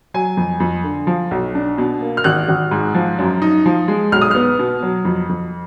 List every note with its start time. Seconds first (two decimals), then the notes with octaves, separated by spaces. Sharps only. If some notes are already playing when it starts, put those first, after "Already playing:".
0.14 F#3 G#5
0.37 F2
0.60 F2
0.84 D3
1.07 F3
1.31 B1
1.55 D4
1.78 B2
2.01 A#3
2.17 F6
2.24 G#1 F#6
2.49 G#1
2.71 G#2
2.94 F3
3.19 F#2
3.42 D#4
3.66 F3
3.88 G#3
4.12 B1 F6
4.22 D#6
4.31 B3 F6
4.59 B2
4.83 F#3
5.05 F2
5.29 F2